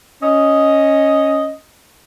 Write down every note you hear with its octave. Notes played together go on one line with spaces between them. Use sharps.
C#4 D#5